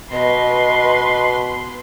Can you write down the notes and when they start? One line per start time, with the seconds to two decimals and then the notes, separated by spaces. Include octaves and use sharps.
0.12 B2 B4 D#5 C6